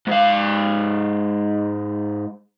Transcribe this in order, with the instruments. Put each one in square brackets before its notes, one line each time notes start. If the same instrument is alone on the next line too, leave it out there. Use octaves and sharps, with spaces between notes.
[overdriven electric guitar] G#2 F5